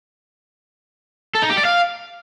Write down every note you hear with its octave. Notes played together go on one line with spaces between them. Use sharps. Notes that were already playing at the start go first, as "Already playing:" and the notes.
A4
D#4
G4
D5
F5